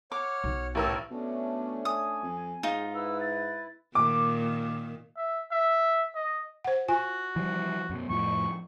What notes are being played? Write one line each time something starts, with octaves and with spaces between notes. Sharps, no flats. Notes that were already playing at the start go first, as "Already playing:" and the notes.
C#5 F#5 D6 F6
B1
A1 G4 A#4 C#5 A5 E6
B2 A3 C#4 D4
G#5 D#6
F2
G#2 D#4 F4 G#4
E4 B4 E6
A6
A#2 D#3 D6
E5
E5
D#5
C5 F#5
F4 F#4 G#5
E3 F3 G3
F#2 B2
F2 A2 F3 C#6